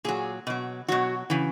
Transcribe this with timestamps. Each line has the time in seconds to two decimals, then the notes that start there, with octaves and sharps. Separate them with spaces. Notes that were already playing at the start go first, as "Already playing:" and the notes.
0.04 A#2 F#3 G#4
0.47 B2 F#3
0.88 B2 F#3 F#4
1.30 C#3 E3